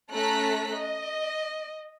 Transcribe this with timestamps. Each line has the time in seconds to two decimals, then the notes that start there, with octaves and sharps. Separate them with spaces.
0.11 A3 C#4 A4 A#5 F#6 B6
0.75 D#5